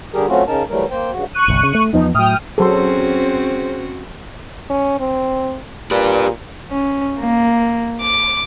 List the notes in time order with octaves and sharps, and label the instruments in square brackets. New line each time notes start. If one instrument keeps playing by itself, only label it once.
[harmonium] D3 G3 G4 G#4 A#4
F#3 A3 C4 C#4 F4 F#4
C#3 C#4 D#4 A#4 A5
E3 F#3 G3 A3 A#4
A#3 C5 G5
G2 C#3 F#4
[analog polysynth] C#6 F#6 D#7
[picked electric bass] G1 C2
C#3
A3
[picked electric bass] E2 F3 B3 [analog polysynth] D#4
[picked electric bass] A2 F#3 [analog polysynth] G5 D#6 F6
[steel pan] F#3 A4 [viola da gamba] C4 C#4 F#4 [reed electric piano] G#4 C6 [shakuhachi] C5
[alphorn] C#4
C4
[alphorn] A#2 [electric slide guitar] G4 B4
[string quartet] C#4
A#3
D6